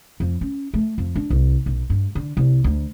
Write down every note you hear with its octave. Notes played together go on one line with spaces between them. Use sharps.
F2
C#4
A3
F2
D4
C2
B1
G2
D3
C2
D2